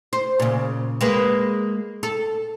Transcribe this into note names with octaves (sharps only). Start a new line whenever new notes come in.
C5
A#2 C#3
G#3 A#3 B4
A4